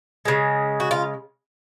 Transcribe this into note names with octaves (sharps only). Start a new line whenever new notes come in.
C#3 G#3
F#4
F4